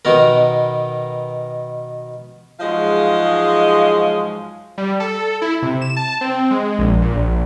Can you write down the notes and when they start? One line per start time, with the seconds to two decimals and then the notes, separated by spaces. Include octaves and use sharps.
0.05 B2 D#3 B3 A#4
2.60 G#2 F3 F#3 G#3 D#5 F5
4.78 G3
5.00 A4
5.42 E4
5.62 C3
5.81 E7
5.96 A5
6.21 C4
6.51 G#3
6.78 A#1
7.02 A#2
7.16 A#1